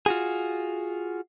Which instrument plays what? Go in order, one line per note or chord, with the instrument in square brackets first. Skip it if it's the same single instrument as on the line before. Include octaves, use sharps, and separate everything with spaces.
[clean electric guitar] F4 F#4 G#4